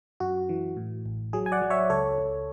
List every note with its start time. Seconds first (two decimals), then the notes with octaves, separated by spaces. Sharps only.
0.20 F#2 F#4
0.49 E3
0.77 A2
1.06 A1
1.33 F#3 G#4
1.46 G#5
1.52 D5 F#5
1.62 F#3
1.70 C#5 E5
1.90 C#2 A4 C#5
2.18 C#2